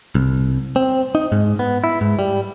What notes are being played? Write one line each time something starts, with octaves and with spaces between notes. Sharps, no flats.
C2
C4
D#4
G#2
B3
E4
G#2
G3